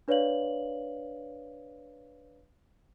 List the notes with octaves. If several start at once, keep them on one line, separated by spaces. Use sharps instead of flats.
D4 B4 C#5 D5 F5 F#7